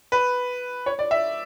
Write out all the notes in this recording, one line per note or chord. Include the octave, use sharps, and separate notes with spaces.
B4
C#5
D5
E5